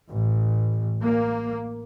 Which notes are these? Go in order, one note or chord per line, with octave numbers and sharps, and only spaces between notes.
A1
A#3